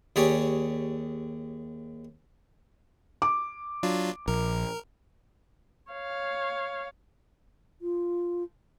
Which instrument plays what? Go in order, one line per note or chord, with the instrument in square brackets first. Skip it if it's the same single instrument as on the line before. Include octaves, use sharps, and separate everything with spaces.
[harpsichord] D#2 G4 G#4 C#5 D5
[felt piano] D6
[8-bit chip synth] F#3 D4 F4
[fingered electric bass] A#1 [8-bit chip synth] A#4
[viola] C#5 F5
[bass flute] F4